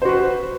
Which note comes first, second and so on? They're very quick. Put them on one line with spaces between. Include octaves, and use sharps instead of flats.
C5 F#4 B4